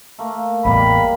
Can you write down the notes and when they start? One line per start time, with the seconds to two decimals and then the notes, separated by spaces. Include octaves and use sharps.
0.18 A3 A#3
0.65 A1 E2 G#2 G3 A#3 B5